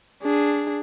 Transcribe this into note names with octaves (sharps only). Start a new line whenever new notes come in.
D4 G#4